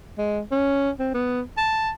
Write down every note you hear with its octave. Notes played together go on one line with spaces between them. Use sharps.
G#3
C#4
C4
B3
A5